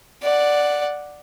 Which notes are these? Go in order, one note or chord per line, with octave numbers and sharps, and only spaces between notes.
D5 F#5